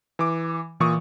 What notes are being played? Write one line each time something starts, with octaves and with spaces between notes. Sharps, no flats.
E3 D6
A#2 E3 C#6 D#6